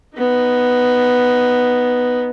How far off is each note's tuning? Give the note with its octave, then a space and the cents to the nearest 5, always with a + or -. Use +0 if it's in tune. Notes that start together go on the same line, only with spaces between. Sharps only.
B3 +0 D#4 +0